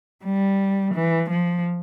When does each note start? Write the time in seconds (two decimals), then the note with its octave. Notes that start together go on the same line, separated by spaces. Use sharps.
0.25 G3
0.95 E3
1.30 F3